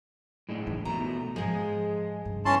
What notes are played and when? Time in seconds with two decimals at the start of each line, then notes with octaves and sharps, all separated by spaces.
0.49 A2 G#3 D4
0.67 E3 D#4
0.85 B2 A3 A#5
1.36 G#2 F3 G#3 G#4
2.25 G2 C#3
2.45 B3 C#4 E4 A5 C6